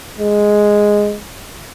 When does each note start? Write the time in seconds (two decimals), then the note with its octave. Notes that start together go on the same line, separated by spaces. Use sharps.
0.19 G#3